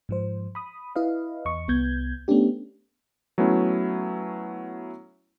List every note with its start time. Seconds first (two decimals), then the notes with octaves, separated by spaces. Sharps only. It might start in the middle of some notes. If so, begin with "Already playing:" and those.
0.09 G#2 F3 C5
0.55 B5 D#6
0.96 E4 B4 D#5 F5
1.45 E2 D#5 C#6
1.68 C2 B3 G6 G#6
2.28 A3 B3 C#4 D4 G4
3.38 F#3 A3 B3 C#4 E4